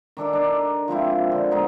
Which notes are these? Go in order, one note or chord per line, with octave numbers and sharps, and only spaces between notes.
D#3 D4 A4 D6
D4 A#4
F3 G#3 C4 E4
D3
G#3 B3 D#4